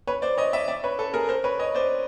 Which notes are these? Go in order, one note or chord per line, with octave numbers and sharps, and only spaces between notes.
B4 C#5
C5 D5
C#5 D#5
D5 E5
D5 E5
B4 C#5
A4 B4
G#4 A#4
A#4 C5
B4 C#5
C#5 D#5
C5 D5